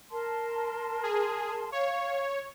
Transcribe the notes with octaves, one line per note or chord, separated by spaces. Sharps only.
A#4 A5 C6
G#4
C#5 F5 C#6